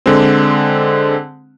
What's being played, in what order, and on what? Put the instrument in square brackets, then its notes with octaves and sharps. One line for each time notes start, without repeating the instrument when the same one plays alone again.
[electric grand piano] D3 G#3 C4